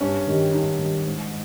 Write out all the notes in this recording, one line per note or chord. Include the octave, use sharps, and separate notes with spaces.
G2 C#4
D#3 G3
G2 D#4
D#3 G3
G#2